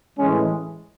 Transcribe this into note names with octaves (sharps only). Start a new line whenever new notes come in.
A2 E3 G#3 C#4